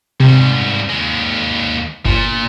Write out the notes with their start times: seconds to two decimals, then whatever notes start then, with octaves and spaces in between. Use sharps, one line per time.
0.20 G#2 C3 G3
0.89 D#2 G#3
2.06 G1 A#2